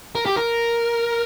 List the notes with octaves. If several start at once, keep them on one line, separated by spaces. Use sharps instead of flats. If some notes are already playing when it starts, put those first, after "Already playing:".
A#4
G4
A#4